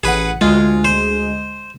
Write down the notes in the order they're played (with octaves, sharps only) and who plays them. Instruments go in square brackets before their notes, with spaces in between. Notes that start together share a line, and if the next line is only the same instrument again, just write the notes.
[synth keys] A1 F#5 [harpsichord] G#4 B4
[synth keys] D2 G#3 [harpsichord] F4
[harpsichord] C5